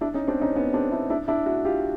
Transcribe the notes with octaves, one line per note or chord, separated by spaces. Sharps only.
D4 E4
C#4 D#4
C4 D4
C#4 D#4
B3 C#4
C4 D4
D4 E4
D4 E4
D4 E4
E4 F#4
F4 G4